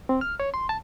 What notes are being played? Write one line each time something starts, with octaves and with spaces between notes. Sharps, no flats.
C4
F6
C#5
C6
A5